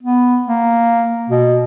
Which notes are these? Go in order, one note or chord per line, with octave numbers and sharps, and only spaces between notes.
B3
A#3
B2